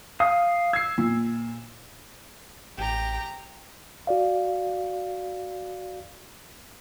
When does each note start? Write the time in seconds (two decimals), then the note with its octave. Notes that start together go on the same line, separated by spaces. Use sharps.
0.20 F5 D#6
0.73 E6 G#6 C7
0.98 A#2
2.78 A1 G4 A#5
4.07 F#4 D5 F5